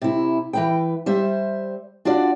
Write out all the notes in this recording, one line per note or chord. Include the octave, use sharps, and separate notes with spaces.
C3 E4
E3 B4 G5
G3 C5 E5
D4 F4 F#4 D5